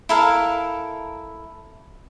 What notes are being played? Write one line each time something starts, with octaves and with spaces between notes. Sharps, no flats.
E4 A4 A#4 F5